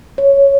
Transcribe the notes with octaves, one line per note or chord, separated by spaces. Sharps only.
C#5